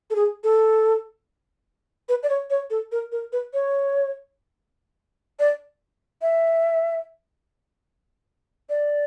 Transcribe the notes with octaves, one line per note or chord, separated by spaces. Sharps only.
A4
G#4
A4
B4
D5
C#5
C#5
A4
A#4
A#4
B4
C#5
D5
E5
D5